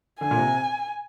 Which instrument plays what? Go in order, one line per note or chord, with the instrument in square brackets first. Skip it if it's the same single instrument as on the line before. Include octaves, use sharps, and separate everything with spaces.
[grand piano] D3 [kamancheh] G#5
[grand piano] A#2
C3